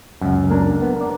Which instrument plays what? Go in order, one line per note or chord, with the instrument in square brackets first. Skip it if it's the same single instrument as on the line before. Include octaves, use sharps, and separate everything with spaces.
[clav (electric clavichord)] C#2 F#2
[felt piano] A#3 D4
[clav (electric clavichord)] B3
A#4 D5